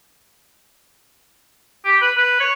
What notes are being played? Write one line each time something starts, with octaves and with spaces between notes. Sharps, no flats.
G4
B4
B4
C#5